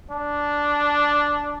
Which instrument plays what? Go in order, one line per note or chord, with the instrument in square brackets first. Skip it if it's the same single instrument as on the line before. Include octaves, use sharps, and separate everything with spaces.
[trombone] D4